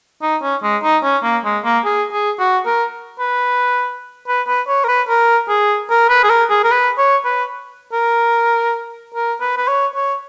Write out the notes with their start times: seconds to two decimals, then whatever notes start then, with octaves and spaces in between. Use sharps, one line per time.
0.22 D#4
0.42 C#4
0.63 G#3
0.83 D#4
1.04 C#4
1.23 A#3
1.45 G#3
1.65 A#3
1.85 G#4
2.12 G#4
2.39 F#4
2.66 A#4
3.20 B4
4.28 B4
4.47 B4
4.68 C#5
4.84 A#4
4.88 B4
5.09 A#4
5.49 G#4
5.90 A#4
6.10 B4
6.24 G#4
6.30 A#4
6.50 G#4
6.64 A#4
6.71 B4
6.98 C#5
7.25 B4
7.93 A#4
9.15 A#4
9.41 B4
9.57 B4
9.68 C#5
9.96 C#5